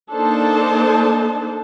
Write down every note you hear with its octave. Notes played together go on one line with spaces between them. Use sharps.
A#3 D4 D#4 A4 C5 A5